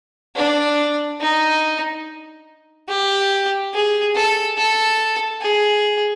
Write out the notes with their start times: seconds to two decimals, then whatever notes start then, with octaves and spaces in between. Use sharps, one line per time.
0.36 D4
1.20 D#4
2.88 G4
3.73 G#4
4.15 A4
4.58 A4
5.41 G#4